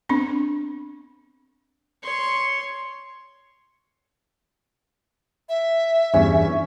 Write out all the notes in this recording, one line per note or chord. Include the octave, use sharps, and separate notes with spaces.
B3 C4 D4
C#5 C6
E5
E2 G2 C#4